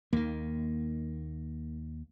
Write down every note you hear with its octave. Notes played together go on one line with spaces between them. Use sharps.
D#2 D#3 A#3